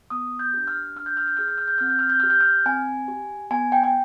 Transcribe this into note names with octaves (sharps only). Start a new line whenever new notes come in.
B3 D#6
G6
D4 G4
F6
D4 F6
G6
F6
G6
G#4 F6
G6
F6
G6
C4 F6
G6
F6
G6
G4 F6
G6
F6
C4 G#5
G4
B3 G#5
G5
G5